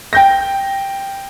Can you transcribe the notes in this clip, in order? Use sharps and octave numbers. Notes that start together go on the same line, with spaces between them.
G5 G6 A#6